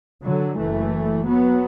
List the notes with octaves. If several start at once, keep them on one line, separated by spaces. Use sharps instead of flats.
D3 F#3
F#1 F#2 E3 A3
F#3 B3